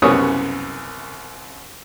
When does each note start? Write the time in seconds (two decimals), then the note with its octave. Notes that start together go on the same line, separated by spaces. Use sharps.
0.02 C2 F#2 C#3 B3 C#5 D#6